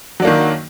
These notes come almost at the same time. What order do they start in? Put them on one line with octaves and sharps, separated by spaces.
F#3 D4 A#3 D#3